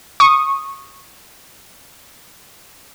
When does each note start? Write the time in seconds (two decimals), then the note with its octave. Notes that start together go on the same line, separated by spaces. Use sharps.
0.20 C#6 D#6